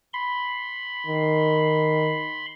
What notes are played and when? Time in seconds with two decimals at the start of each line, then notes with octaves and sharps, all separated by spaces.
0.13 B5 C6
1.07 D#3